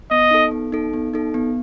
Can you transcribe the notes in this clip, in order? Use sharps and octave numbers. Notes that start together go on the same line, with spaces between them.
B3 D#5
D#4 A4
B3
D#4 A4
B3
D#4 A4
B3